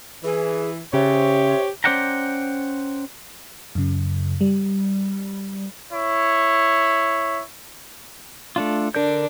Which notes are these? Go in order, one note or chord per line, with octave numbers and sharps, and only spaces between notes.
E3 G#4
C#3 G4 C5 C#5 E5
C#4 C5 D5 F#5 G5 A#5
F#2 C#3
G3
E4 C#5
A3 D4 F4
D3 D4 A#4 G6